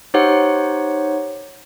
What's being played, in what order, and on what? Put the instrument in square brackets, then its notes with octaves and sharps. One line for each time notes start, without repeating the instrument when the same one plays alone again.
[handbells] D#4 G4 C5 C#5 F#5